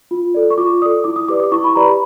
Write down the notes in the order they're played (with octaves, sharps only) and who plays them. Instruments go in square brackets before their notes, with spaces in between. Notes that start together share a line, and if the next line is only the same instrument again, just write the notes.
[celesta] F4
A4 D5
C#6
F4 D6
A4 D5 D#6
E4 D6
D#6
G4 B4 D5 D6
D6
E4 C#6
B5
G4 B4 D5 A#5
B5